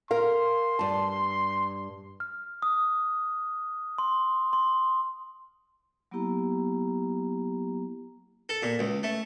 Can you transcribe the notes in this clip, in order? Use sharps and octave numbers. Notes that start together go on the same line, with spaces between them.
A#4 F5 C6
G2 A5
F6
D#6
C6
C6
F#3 A#3 B3 E4 G4 A#5
A4
A#2
C#2
A3